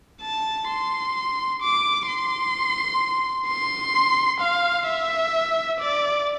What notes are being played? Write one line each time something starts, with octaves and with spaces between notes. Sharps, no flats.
A5
C6
D6
C6
C6
F5
E5
D5